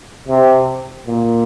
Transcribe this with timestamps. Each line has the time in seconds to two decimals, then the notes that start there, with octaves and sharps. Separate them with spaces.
0.28 C3
1.07 A#2